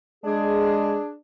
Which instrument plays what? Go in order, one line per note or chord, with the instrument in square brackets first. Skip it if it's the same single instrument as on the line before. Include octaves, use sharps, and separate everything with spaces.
[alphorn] G#3 [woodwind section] D4 G#4